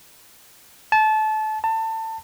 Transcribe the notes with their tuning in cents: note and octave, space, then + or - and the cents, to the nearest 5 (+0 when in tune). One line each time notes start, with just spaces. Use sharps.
A5 -25
A5 +25